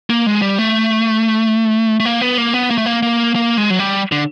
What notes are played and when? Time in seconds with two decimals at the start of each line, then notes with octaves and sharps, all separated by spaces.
0.10 A#3
0.26 G#3
0.42 G3
0.58 A3
2.00 A3
2.05 A#3
2.21 B3
2.38 A#3
2.54 B3
2.71 A#3
2.78 A3
2.86 A#3
3.03 A#3
3.35 A#3
3.57 G#3
3.70 F#3
3.79 G3
4.12 D3